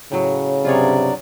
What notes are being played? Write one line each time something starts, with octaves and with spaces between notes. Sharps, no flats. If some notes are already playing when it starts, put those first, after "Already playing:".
A2 C#3 F#3
G2 C3 F#3 F4 G#4 C#5 D5